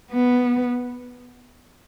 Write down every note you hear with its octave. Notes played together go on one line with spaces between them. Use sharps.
B3